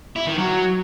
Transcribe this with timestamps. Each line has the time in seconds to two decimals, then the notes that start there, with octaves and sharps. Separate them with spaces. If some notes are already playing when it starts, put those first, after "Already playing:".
0.16 E4
0.27 D#3
0.38 F#3